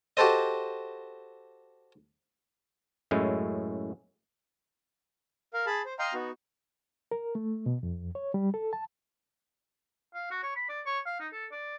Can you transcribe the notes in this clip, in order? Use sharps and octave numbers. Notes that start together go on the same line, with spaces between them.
F#4 G4 A4 C5 D#5
F#2 A2 G#3 C#4 E4
A#4 F5
G#4 A5 B5
C5
D#5 F5 G5 A#5 C6
B3 D#4 F#4
A#4
A3
B2
F2
C#5
G3
A4
A5
F5
F#4
C#5
B5
D5
C#5
F5
D#4
A4
D5